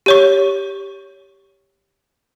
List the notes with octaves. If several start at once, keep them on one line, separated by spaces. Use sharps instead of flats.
G4 C#5 C#6